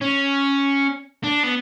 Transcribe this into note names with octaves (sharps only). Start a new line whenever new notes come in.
C#4
D4
B3